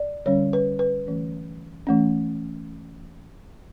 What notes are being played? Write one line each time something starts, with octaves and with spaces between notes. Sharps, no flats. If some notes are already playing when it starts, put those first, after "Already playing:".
Already playing: D5
D3 G3 C#4 C#5
B4
B4
E3 A3 C#4
E3 A3 C#4